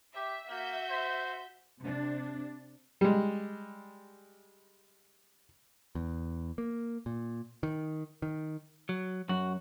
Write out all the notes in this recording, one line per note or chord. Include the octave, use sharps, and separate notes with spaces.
G4 E5
A#3 F#4 E5 G6
C5
C3 D4
G3 G#3
E2
A#3
A#2
D#3
D#3
F#3
F#2 F#4